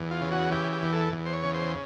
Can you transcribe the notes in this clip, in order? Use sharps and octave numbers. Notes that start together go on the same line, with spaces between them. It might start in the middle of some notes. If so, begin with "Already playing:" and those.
Already playing: E2
F4
C#3
F#4
E3 G4
G4
E2
A4
E2
C5
C#5
C#3
C5